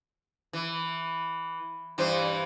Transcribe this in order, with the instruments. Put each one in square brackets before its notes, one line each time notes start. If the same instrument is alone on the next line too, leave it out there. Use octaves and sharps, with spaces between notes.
[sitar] E3
G2 E3 C5